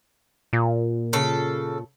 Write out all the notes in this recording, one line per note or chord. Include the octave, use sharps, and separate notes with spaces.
A#2
C#3 A4